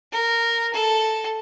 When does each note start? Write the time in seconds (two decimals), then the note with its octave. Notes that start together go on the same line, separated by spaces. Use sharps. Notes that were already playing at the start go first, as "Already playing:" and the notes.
0.12 A#4
0.73 A4